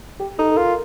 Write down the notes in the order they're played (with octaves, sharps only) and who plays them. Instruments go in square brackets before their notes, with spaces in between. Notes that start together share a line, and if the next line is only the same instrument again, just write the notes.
[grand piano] G4
[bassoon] D#4 [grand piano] A4
[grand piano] A4
[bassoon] F4 [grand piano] A#4